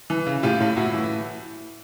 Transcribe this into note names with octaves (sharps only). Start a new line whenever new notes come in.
E3
C#3
A2 F4 G4
A2
A2 E4 F#4
E3